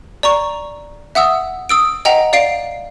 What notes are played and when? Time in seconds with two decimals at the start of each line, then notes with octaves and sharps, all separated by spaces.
0.23 D5 A#5 C#6
1.15 E5 F#5 D#6 E6
1.69 D#6 E6 D7
2.05 D#5 F#5 G5 A#5
2.33 D5 F5 C7 D7